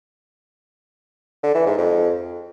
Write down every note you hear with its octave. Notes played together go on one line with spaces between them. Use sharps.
D3
E3
G#2
F2